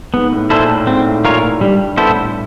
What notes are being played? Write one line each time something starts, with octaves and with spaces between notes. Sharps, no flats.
G#2 B3
A2
A#2 E4 A4 C5
A2
G#2 C4
A2
A#2 F4 A#4 C#5
A2
G2 G3
B3 E4 A4 C5
A2